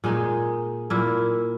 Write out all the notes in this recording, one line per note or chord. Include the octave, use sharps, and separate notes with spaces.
A#2 G#3 D#4 G#4
A#2 A#3 E4